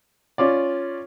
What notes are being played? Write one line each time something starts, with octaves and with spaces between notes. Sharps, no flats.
C#4 F4 D5